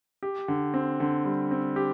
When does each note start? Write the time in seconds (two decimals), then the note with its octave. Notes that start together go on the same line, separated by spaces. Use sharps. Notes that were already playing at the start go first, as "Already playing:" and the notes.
0.23 G4
0.48 D3
0.74 C4
1.00 D3
1.25 G3
1.51 C4
1.76 G4